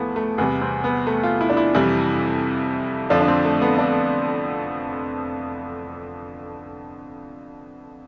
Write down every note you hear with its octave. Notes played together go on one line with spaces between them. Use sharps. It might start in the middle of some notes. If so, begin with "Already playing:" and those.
Already playing: E2 F3 A3 B3 E4
A3
E2 C3 G3 B3
C4
B3
A3
F4
E4
D4
E4
F2 C3 E3 G3 E4
F2 D3 F3 D4
D4
C4
A3
B3
D4